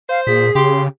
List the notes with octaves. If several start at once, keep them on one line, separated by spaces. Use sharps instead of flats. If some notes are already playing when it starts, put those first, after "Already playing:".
C5 F5
A#2 G#4 B6
C#3 G4 C6